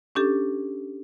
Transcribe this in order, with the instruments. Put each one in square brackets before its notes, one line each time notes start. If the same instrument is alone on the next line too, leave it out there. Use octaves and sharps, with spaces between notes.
[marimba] C#4 D4 G4 A4